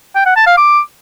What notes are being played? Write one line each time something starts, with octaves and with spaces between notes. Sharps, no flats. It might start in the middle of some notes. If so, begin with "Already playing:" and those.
G5
F#5
A5
F5
D6